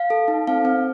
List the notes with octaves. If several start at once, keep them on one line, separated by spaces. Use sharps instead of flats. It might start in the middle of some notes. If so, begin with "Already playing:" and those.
Already playing: F5
A4
D#4
C4 F5
C4